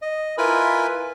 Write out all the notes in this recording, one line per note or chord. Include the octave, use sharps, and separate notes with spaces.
D#5
E4 F4 A#4 B4 G#5 B5